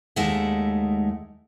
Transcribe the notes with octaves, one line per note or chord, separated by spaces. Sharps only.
D#2 G#3 A3 D#4 E5 F#5